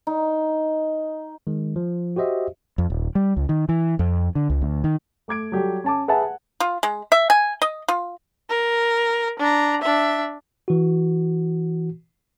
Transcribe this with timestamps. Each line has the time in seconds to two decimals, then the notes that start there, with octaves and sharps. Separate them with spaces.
0.07 D#4
1.47 D#3 G#3
1.76 F3
2.16 F#4 G4 C5 D#5 E5
2.78 F2
2.90 D#1
3.15 G3
3.37 C#2
3.49 D#3
3.69 E3
3.99 F2
4.35 D3
4.50 C#2
4.62 D2
4.84 D#3
5.28 A3 D6 G#6 D7
5.52 F#3 G3 G4 A4
5.84 C#4 A5 D6
6.08 G#4 B4 E5 F#5 G#5 A5
6.22 F#5
6.60 F4
6.83 G#3
7.12 E5
7.30 G#5
7.62 D#5
7.88 F4
8.50 A#4
9.39 D4 A#5
9.81 D4 E5
10.68 E3 F#4